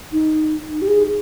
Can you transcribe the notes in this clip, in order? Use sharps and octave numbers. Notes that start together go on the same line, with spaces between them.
D#4
G4
G#4